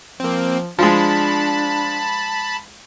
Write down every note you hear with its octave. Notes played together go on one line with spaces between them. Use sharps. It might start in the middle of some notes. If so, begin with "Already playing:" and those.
F3 A#3 C4
F3 G#3 D4 A5 B5